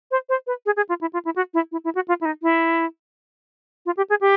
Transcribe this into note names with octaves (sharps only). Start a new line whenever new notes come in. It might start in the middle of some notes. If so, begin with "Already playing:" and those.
C5
C5
B4
G#4
G#4
F4
E4
F4
E4
F#4
E4
E4
E4
F#4
F4
E4
D#4
E4
F4
G4
G#4
G4